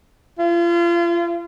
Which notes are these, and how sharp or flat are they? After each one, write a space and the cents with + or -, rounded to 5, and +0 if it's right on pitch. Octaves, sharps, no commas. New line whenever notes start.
F4 -35